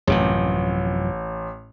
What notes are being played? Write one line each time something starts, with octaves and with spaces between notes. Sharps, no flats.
A1 F#2 C3 F3